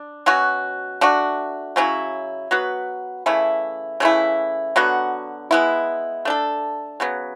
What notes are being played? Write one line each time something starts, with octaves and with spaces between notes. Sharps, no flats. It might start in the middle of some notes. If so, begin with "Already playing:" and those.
Already playing: D4
B2 F#3 C#4 F#4
A3 D4 F#4
C#3 F#3 C#4 E4
F#3 B3 F#4 B4
C#3 E3 A3 E4
C#3 E3 A3 E4
D3 F#3 B3 F#4
G#3 B3 E4
A3 D4 A4
C#3 F#3 B3